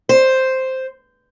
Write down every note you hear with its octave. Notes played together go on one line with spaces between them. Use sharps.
C5